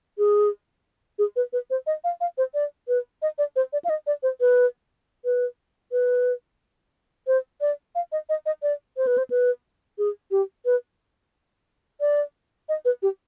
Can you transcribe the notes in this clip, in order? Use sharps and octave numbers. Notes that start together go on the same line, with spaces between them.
G#4
G#4
B4
B4
C5
D#5
F5
F5
C5
D5
B4
D#5
D5
C5
D5
F5
D#5
D5
C5
B4
B4
B4
C5
D5
F5
D#5
D#5
D#5
D5
C5
B4
C5
B4
G#4
G4
B4
D5
D#5
B4
G4